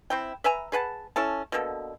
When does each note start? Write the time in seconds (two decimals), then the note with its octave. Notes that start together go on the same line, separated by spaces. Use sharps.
0.10 C4 E4 G5
0.44 B4 E5 G#5 A#5
0.72 G#4 B4 F#5 A5
1.16 C#4 E4 A4 A5
1.52 B2 D3 A#3 A4